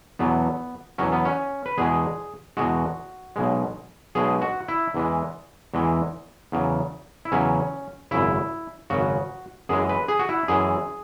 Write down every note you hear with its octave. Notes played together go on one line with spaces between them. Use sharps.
E2 B2 F#3 B3
E2 B2 F#3 C#4
B3
C#4
B4
E2 B2 G#3 G#4
E2 B2 G#3 F#4
B1 B2 G#3
B1 B2 G#3 G#4
F#4
E4
E2 E3 G#3
E2 E3 G#3
E2 C#3 F#3
E4
E2 C#3 F#3 C#4
G#1 F#2 C#3 E4
G#1 F#2 C#3 F#4
F#2 E3 G#3 G#4
B4
G#4
F#4
E4
F#2 E3 G#3 G#4